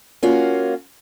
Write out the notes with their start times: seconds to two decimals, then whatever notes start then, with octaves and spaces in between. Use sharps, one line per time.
0.23 A#3 C#4 F4 F#4